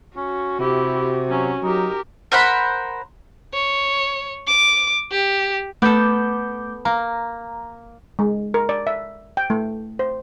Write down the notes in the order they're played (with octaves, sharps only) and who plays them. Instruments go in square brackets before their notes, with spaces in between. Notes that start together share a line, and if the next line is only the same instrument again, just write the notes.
[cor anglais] C#4 [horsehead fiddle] F#4
[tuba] C3 [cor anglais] E4 [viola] G4
[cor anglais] F#3 [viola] C#4
[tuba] F#3 [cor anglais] D#4 [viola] G4 A#4
[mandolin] A#4 C5 F#5 B5
[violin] C#5
D6
G4
[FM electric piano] A3 D6 G6 [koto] B3 A4
[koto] A#3 [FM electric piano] A#5
[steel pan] G#3
A#4
D5
E5
G5
A3
C5